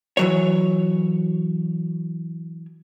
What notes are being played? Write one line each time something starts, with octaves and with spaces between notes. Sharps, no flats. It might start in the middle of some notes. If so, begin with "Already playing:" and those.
E3 F#3 C#5